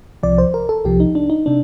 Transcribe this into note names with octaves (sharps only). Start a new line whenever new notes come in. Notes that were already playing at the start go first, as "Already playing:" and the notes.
C2 C3 F3 D5
C5
A#4
A4
C2 C3 F3 G4
D#4
D4
D#4
C3 D4